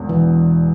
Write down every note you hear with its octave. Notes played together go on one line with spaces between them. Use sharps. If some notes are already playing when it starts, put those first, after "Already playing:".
Already playing: E1 E2
E3